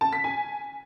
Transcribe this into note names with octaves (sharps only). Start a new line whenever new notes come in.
A5
B6
G#5